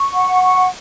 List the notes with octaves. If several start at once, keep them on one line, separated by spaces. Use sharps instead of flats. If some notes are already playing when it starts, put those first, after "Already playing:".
Already playing: C#6
F#5
C#6